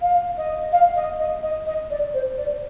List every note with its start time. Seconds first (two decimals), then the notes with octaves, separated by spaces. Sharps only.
0.01 F5
0.37 D#5
0.72 F5
0.95 D#5
1.19 D#5
1.42 D#5
1.66 D#5
1.90 D5
2.14 C5
2.37 D5